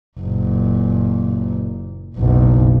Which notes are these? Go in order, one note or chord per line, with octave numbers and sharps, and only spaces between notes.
F#1 A#2
F#1 B1